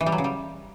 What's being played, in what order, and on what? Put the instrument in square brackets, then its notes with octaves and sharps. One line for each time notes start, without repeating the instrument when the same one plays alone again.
[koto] E3
G3
F#3
C#3
G3